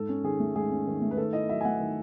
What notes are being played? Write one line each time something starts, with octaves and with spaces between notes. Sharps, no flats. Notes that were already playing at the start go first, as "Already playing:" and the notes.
Already playing: G#2 A4
C#4
D#3 G#4
A3
G#2 G#4
C#4
D#3
A3
B4
D#3 A4
E4 D#5
F#3 E5
G#5
A3 F#5
D#3